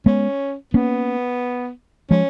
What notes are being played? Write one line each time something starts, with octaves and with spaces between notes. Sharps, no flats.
G#3 B3 C#4
A#3 B3 C#4
F3 G#3 C#4